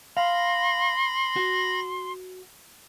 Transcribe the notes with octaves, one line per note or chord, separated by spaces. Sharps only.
F5 B5 C6 A#6
F#4